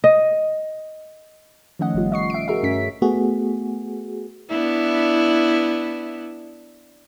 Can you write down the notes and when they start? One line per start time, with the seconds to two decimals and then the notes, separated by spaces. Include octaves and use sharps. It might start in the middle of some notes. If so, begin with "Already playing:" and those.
0.04 D#5
1.79 D#3 F3 A3 C#4 D#5 F#5
1.95 G1 B2 G3 F4
2.12 D#5 C#6 C7
2.30 E5 D7
2.48 F#4 G#4 A#4 E5
2.63 G2 A3 C#4 B6
3.02 A3 B3 F#4 G#4
4.49 B3 D4 E4